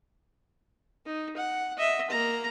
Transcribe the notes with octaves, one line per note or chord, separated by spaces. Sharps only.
D#4
F#5
D#5 E5
A#3 A#5